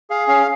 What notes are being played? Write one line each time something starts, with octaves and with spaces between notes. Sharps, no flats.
G#4 F5
C#4 F5